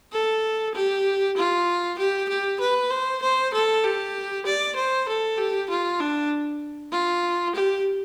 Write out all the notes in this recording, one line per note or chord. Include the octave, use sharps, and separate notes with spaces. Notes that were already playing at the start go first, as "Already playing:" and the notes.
A4
G4
F4
G4
G4
B4
C5
C5
A4
G4
D5
C5
A4
G4
F4
D4
F4
G4